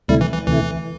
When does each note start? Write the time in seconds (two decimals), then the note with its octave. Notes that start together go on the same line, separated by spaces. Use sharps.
0.08 D2 C3 G3 A3 E4
0.21 E3
0.34 E3
0.46 D2 C3 E3 A3 E4